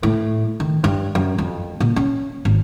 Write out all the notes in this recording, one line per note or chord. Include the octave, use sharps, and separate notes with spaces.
A2
D#3
G2
F#2
F2
A#2
C#4
G#1